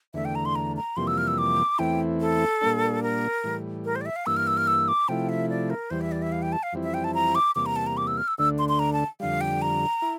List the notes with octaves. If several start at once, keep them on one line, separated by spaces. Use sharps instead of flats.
E2 D3 A3 E5
G5
A#5
C6
A#5
A#5
F2 C3 E3 G3 A#3 C6
E6
F6
E6
D6
E2 E3 A3 C4 E4 G5
A4
A#2 G3 A#3 D4
A#4
A2 E3 G3
A#4
C5
D5
E5
F5
G2 E3 A#3 E6
F6
E6
F6
E6
D6
C3 F3 A3 E4 G5
E5
D5
A#4
E2 E3 G3 C5
E5
D5
E5
F5
G5
A5
F5
F2 E3 G3 C4 E4
E5
G5
A5
A#5
D6
E2 C3 G3 A#3 D6
A#5
A5
A#5
D6
E6
F6
E6
D2 D3 A3 D4 E6
C6
C6
A#5
A5
F2 D3 G3 F5
G5
A#5
E4